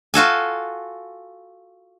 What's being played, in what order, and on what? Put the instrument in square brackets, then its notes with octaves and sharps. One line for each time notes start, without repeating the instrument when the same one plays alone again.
[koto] F4 F#4 A4 G#5